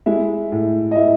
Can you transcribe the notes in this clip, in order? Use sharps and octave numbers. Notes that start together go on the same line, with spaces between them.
G#3 E4 E5
A2
D#5
A2 E4 E5